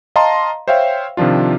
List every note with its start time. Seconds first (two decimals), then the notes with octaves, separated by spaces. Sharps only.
0.16 D#5 F5 A5 A#5 C6
0.68 C5 C#5 E5 F5 G5
1.17 C3 D#3 F3 D4 F4